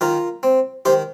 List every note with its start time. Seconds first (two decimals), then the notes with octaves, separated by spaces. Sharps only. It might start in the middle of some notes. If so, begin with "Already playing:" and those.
0.01 D#3 F4 A#4
0.43 C4
0.85 D#3 G4 C5